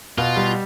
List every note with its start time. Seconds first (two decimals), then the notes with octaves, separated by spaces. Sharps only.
0.18 B2 F4
0.37 G3